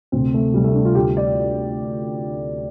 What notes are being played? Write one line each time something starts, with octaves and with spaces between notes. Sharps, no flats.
D2 C3 C4
A3
D2 C3 G3
A3
D4
F4
D2 D3 G4
D5